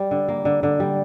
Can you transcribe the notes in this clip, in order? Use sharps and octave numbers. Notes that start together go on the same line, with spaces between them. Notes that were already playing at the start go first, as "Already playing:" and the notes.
Already playing: G3
D3
A#3
D3
D3
G3